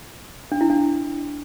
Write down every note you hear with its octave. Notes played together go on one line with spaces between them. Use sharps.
D4
E4
D4